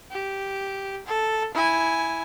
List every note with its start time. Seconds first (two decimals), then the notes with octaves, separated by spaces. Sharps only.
0.11 G4
1.06 A4
1.54 E4 G#5